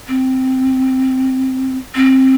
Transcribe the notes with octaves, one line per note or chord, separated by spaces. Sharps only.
C4
C4